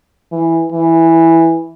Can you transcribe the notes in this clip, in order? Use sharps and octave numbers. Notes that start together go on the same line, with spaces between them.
E3
E3